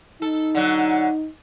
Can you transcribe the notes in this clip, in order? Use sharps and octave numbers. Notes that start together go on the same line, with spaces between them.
D#4 A4
D3 F#3